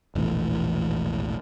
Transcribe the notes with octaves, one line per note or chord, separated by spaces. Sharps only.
E1 A#1 A2 E3